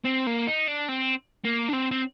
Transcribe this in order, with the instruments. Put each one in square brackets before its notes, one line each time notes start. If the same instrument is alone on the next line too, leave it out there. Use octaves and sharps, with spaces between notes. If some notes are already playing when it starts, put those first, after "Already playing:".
[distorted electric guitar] C4
A#3
D#4
D4
C4
A#3
D4
C4
C4